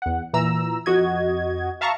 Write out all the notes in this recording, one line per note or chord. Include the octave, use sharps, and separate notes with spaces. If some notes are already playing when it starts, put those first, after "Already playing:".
E2 F#5
A#2 E3 A#5 E6
F2 F#4 D#5 G#6
E5 F5 A5 A#5 C#6